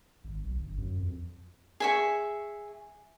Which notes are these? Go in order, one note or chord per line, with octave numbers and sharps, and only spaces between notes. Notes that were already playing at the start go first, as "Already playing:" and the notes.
G#1
B1
G1
F#2
F2
G#4 E5 C#6